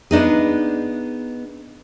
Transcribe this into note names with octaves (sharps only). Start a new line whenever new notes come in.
B3 D4 D#4 G#4